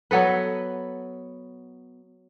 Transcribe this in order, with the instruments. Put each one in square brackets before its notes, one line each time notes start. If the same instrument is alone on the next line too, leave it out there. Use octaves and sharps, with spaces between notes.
[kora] F#3 B3 A4 B4